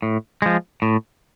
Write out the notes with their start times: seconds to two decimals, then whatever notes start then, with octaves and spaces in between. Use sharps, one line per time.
0.02 A2
0.42 F3 G#3
0.82 A2